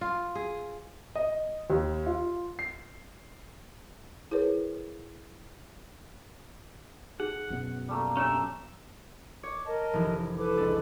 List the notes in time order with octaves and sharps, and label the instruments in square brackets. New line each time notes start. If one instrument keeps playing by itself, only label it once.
[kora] F4
G#4
[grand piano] D#5
D#2
F4
C7
[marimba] E4 G#4 A#4 B4 C#5
[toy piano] D#4 G#4 [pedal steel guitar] F#5
[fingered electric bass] F#2 B2
[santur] G3 A3 A#3
[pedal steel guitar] C#4 G4 E5 [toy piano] D4 C#5
[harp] C#5 [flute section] D6
[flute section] A#4 D#5 A5
[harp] F1 E3
[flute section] A4 B4 D6
[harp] C#2 D4